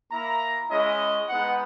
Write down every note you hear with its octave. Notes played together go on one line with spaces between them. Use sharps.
A#3 E4 A#5
G#3 C#4 E4 D#5
G#3 B3 D#4 F#5